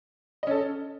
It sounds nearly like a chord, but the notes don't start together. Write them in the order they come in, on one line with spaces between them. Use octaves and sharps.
D#5 C#4 A4